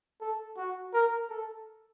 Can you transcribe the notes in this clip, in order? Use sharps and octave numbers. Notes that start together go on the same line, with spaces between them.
A4
F#4
A#4
A4